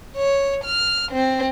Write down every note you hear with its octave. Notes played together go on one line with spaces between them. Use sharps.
C#5
F6
C4